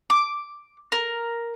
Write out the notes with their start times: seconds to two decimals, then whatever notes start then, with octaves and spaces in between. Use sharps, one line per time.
0.10 D6
0.92 A#4